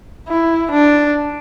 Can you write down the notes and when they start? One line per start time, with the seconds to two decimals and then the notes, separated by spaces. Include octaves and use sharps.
0.28 E4
0.71 D4